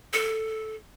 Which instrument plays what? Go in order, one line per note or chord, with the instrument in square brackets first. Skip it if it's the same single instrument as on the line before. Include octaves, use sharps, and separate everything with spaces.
[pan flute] A4